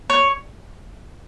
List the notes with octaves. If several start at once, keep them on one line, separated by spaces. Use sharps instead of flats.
C#5